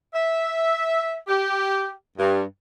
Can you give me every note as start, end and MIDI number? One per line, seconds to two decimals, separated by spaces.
0.14 1.18 76
1.27 1.90 67
2.18 2.43 43